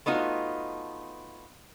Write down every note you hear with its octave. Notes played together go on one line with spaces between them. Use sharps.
A3 B3 D#4 F4 F#4